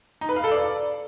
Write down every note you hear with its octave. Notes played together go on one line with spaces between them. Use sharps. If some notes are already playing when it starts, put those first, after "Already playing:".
D#4
B4
F5
A4
D5